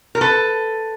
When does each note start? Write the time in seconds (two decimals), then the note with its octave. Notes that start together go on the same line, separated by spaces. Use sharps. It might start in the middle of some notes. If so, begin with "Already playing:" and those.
0.15 A#4
0.21 A4 B4